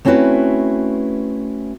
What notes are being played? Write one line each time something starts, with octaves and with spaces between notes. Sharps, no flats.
A3 C4 C#4 E4 F#4 B4